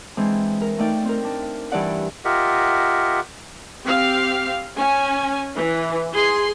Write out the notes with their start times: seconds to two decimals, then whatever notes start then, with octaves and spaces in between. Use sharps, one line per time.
0.17 E3 G#3 C4 D4
0.62 A#4
0.78 A3 D#4 D5 G5
1.05 C4 A#4
1.24 D4
1.72 G2 E3 D4 D5 F#5
2.25 F4 G4 A#4 D#5 E5 F#5
3.85 C4 G4 F5
4.76 C#4 G#5
5.56 E3
6.14 G#4 C6